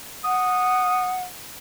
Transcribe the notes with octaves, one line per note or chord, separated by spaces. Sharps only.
F#5 D#6